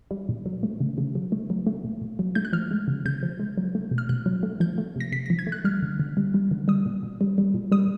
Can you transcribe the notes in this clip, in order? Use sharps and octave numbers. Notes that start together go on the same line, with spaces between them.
G3
A#2
F#3
A3
C#3
C#3
F#3
A3
F#3
A3
A#2
A#2
F#3
A3 G6
F#6
F3 F6
G#3
C#3
C#3 G6
F3
G#3
F#3
A3
B2
F6
B2 F#6
F#3
A3
F3 G6
A3
C3 A#6
C3 B6
F3 A#6
G#6
A3
F#6
G3 F6
D3
D3
G3
G3
D3
G3 D#6
A#2
A#2
G3
G3
A#2
G3 D#6